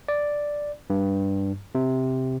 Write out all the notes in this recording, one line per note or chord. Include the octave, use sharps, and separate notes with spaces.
D5
G2
C3